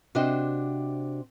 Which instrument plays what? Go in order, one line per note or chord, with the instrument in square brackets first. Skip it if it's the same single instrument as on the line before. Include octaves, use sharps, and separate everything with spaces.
[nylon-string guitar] C3 D4 F#4 C5 D#5 G5